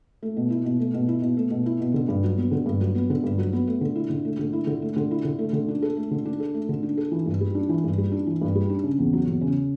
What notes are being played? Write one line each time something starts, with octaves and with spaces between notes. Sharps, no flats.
A3
B2
E4
B2
A3
B2
E4
B2
A3
B2
E4
B2
D3
G2
F#3
B3
D3
G2
F#3
B3
D3
G2
F#3
B3
A3
D3
E4
D3
A3
D3
E4
D3
A3
D3
E4
D3
A3
D3
D4
A4
A3
D3
D4
A4
A3
D3
D4
A4
E3
G2
G3
D4
E3
G2
G3
D4
E3
G2
G3
D4
C#3
E2
F#3
E2
C#3